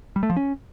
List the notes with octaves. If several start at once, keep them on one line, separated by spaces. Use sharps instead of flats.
G3
A3
F3
C#4